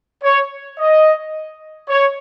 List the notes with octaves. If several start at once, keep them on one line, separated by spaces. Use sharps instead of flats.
C#5
D#5
C#5